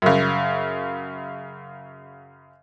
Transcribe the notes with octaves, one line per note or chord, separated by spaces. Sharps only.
F#2 C#3